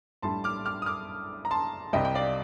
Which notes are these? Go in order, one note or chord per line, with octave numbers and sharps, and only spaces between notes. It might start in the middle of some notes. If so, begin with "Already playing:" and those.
A#1 A2 G3 A5 C6
D6 F6
D6 F6
D#6
D6 F6
A#5
A5 C6
C2 C3 G3 D#5 G5
G5
D5 F5